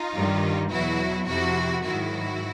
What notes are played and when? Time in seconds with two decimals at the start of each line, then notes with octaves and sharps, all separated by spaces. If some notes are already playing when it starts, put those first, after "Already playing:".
Already playing: D#4 F4
0.14 G2 D#3 G3
0.71 E2 B2 F#3 E4 F#4
1.28 F2 C3 F3 E4 F#4
1.85 G#2 D#3 F#3 E4 F#4